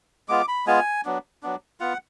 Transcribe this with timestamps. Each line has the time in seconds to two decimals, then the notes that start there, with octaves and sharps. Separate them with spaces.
0.29 G#3 B3 F4 D6
0.48 B5
0.66 G#3 B3 F4 G#5
1.05 F#3 B3 D4
1.43 F#3 B3 D4
1.80 B3 F4 F#5